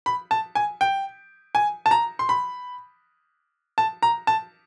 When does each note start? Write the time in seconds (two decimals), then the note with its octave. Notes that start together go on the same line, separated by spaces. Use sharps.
0.06 B5
0.31 A5
0.55 G#5
0.81 G5
1.55 G#5
1.86 A5
1.91 A#5
2.19 C6
2.29 B5
3.78 A5
4.02 A#5
4.27 A5